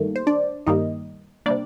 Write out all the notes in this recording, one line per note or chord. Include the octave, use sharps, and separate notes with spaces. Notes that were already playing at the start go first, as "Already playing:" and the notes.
Already playing: G2 D#3 G3 A3 A#3
C5
D4 D5
G2 D#3 G3 A#3 D#4 D#5
C3 G3 A#3 D4 D5